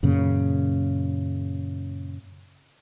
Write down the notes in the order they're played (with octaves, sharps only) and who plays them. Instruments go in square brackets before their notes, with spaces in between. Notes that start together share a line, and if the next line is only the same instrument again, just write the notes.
[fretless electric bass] F#2 A#2 C#3